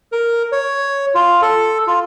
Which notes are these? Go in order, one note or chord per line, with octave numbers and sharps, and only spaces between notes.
A#4
C#5
F4
A4
F4